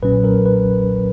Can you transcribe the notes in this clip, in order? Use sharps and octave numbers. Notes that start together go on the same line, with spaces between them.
B1 A#2 F#3 C#4 B4
A#4
B4